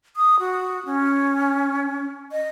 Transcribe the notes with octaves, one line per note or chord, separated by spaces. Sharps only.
D#6
F#4
C#4
D#5